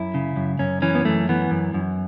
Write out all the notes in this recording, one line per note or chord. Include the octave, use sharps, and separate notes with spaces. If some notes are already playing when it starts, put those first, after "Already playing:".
Already playing: F#2 E4
C#3
F#2
F#2 C#4
E3 C#4
B3
F#2 A3
E3 B3
F#2
F#2